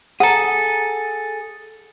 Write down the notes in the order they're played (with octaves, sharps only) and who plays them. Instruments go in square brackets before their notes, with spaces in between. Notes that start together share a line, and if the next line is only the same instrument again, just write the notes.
[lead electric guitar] G#4 A4 [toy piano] F#5 A#5